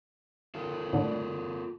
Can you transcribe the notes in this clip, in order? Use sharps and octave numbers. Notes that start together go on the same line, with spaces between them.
F4 A4 A#4
A2 D3 D4